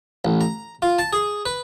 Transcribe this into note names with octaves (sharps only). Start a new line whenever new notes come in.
A1
A#5
F4
A5
G#4
B4